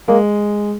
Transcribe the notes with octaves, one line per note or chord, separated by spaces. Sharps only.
G#3 A#3